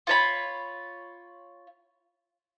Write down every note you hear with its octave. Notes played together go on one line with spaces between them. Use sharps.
F4 C#5 B5